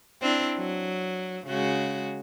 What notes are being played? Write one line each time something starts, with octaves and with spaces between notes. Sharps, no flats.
C4 D4 E4
F#3
C#3 G#3 F#4